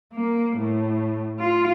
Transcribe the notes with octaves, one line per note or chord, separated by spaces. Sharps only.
A#3
A2
F4